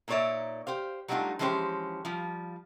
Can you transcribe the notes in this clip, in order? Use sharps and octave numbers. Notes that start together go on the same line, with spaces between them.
A#2 A#3 D#4 C#5 D5 E5
G4 C5 F5
F#3 G3 A3 D4 D#4 F4
E3 F3 G#3 C#4 G4 C5
F3 G3 F4